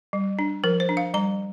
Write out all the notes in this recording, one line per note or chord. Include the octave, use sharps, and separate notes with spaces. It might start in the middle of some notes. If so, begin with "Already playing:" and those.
G3
D4
F3 A#4
C5
D4
F5
G3 A#5